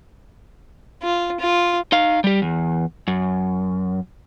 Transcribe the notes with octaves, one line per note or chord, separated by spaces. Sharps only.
F4
F4
D#4 F5
G3 G4
E2
F#2